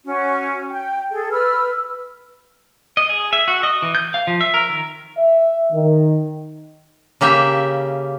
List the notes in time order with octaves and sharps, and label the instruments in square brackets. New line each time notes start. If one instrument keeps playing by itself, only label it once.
[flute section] C#4 F#4
G5
G#4 A4
B4 E6 F6
[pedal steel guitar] D#5
G#4
E5
F#4
D#5
E3
G6
F5
F3
E5
A#4
D#3
[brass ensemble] E5
D#3
[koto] C#3 A#3 G4 E5